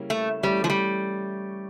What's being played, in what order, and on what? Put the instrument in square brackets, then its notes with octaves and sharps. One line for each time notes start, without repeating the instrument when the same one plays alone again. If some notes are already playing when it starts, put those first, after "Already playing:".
Already playing: [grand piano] C#3 G3 A#3 C#4 E4
[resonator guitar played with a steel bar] A3
[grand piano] E3 A3 C#4 [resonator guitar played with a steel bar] G3
[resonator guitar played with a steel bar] F3
G3